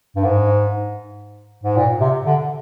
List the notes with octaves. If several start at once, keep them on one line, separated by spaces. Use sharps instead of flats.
G2
G#2
G#2
A#2
C3
D3